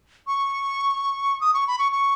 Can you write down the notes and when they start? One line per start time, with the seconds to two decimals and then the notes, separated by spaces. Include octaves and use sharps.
0.27 C#6
1.41 D#6
1.54 C#6
1.67 B5
1.79 C#6
1.92 C#6